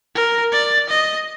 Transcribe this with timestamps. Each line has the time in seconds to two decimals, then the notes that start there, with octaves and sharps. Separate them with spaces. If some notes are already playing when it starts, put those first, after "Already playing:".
0.15 A#4
0.52 D5
0.89 D#5